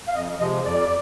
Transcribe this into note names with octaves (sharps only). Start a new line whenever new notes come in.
F5
F2 D#5
C3 F3 G#3 D#5
F2 D5